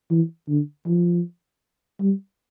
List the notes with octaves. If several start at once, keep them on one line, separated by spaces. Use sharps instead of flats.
E3
D3
F3
G3